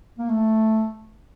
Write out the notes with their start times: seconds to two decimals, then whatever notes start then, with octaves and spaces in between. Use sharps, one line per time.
0.18 A#3
0.29 A3